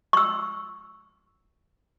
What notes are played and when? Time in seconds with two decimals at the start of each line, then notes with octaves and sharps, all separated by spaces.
0.13 C#6 E6